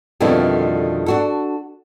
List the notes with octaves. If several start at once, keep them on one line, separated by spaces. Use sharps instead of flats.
F2 B2 D3 D#3 G3 E4
D4 F#4 A4